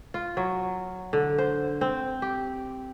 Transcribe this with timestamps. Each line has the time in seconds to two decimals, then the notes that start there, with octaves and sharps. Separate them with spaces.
0.14 F4
0.37 F#3
1.13 D3
1.38 C5
1.81 C4
2.22 G4